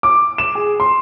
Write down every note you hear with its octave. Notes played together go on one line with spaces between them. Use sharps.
D6
E7
G#4
C6